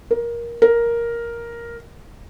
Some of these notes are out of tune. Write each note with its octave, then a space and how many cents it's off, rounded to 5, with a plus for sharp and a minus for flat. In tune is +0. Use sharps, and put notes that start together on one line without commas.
A#4 +15
A#4 +5